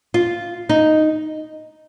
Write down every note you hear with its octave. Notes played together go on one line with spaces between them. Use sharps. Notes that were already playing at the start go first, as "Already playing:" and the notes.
F4
D#4